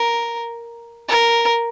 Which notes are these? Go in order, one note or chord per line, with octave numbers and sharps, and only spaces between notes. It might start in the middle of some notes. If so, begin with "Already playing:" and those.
Already playing: A#4
A#4